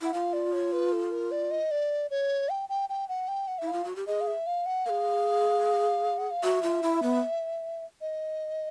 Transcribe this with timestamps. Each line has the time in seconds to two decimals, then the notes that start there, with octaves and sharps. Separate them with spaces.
0.01 E4 F#5
0.13 F4 F5
0.33 D5
0.53 C#5
0.72 B4
0.92 A4
1.11 A#4
1.31 D5
1.51 D#5
1.71 D5
2.11 C#5
2.49 G5
2.69 G5
2.89 G5
3.09 F#5
3.28 G5
3.48 F#5
3.58 E4 E5
3.68 F5
3.73 F4
3.85 F#4
3.96 G4
4.07 G#4 D#5
4.21 F5
4.27 E5
4.47 F5
4.66 F#5
4.86 A#4 F5
4.89 G#4
6.18 F#5
6.31 F5
6.43 F#4 E5
6.63 F4
6.83 E4
7.03 B3
8.01 D#5